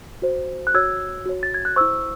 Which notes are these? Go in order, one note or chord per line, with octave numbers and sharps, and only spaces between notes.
F#4 C5
F#6
F#4 C#5 E6 G#6
F#4 C#5
A6
G#6
F#6
E4 C5 C#6 E6